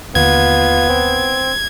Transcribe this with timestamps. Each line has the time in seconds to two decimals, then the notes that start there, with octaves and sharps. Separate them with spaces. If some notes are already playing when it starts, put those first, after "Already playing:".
0.15 D#2 D3 A#3 B3 F4 G#6
0.89 C4